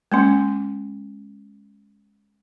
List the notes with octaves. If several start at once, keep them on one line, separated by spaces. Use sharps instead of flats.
G#3 A#3 C#4